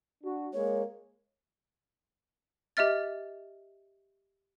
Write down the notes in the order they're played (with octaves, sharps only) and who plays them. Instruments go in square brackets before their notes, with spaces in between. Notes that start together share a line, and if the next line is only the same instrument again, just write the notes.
[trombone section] D4 F#4
[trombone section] G#3 A#3 [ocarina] C#5
[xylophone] G4 D#5 E5 F6 A6